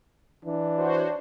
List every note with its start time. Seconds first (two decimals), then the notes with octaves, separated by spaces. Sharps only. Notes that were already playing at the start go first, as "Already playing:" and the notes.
0.45 E3 D4
0.78 F#4 C5 C#5